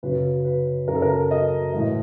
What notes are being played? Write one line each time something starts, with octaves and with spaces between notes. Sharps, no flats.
F#2 C#3 F#3 B4
B4
F#2 C#3 F#3 A#4
A4
A#4
D#5
A2 E3 G#3 D#5